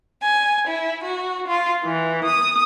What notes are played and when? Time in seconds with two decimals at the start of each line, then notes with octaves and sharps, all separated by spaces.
0.22 G#5
0.66 E4
1.03 F#4
1.47 F4
1.83 E3
2.26 D#6